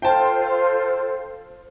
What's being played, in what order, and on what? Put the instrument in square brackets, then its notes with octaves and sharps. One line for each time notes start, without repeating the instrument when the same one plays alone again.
[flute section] F4 A4 C5 [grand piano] G5 A5